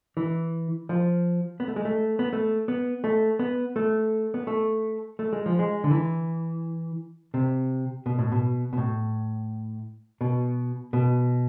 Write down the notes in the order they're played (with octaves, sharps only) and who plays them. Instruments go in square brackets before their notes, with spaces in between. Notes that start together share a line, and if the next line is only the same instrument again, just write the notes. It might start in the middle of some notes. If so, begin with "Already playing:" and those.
[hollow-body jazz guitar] E3
F3
B3
A3
G#3
A3
B3
A3
B3
A3
B3
A3
B3
A3
A3
G#3
F3
G#3
D3
E3
C3
B2
A2
B2
B2
A2
B2
B2